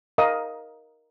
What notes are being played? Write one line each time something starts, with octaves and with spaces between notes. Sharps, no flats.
A#4 D#5 F5 D#6